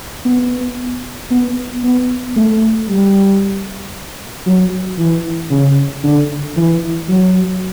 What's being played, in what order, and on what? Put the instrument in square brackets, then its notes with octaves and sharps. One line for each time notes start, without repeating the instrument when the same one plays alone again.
[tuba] B3
B3
B3
A3
G3
F#3
E3
C#3
D3
E3
F#3